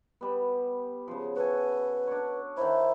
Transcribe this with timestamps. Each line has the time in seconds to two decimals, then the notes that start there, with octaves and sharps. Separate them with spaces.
0.21 G3 B3
1.08 C#3 F3
1.36 F#4 A4 B4 G#5
2.07 D4 C#5
2.57 D#3 E4 C5